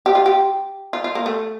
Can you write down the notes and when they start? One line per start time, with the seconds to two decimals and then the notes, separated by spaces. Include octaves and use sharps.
0.06 G4
0.15 F4
0.26 G4
0.93 F4
1.04 F4
1.15 A#3
1.26 A3